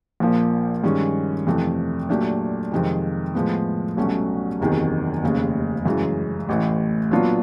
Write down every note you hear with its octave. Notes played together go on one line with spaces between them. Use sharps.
A#1 A#2 F3 A#3
G2 D#3 G#3 C#4
F2 C3 E3 A3
A#2 F#3 A3 D4 G4
F2 C3 D#3 G#3
A2 F3 G#3 B3
C2 B2 F#3 A3 C#4
F#1 E2 C3 D#3 F#3
F1 D#2 C#3
F#2 C#3 E3 G#3
A1 A2 E3
A#2 F#3 B3 D4 F4